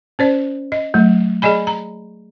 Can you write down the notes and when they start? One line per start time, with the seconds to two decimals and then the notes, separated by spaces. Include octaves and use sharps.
0.19 C#4 C5 D5
0.72 D#5
0.94 F#3 A3
1.42 G#4 D5 D#5 G#5 B5
1.67 A#5